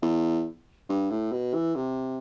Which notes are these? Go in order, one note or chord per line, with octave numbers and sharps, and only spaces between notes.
E2
G2
A2
B2
E3
C3